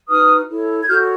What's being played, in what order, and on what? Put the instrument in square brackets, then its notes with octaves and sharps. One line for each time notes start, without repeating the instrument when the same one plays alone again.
[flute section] D#4 F#4 B4 D#6 F6
E4 A4 C#5
G#6
F#4 A4 C#5 F6 G6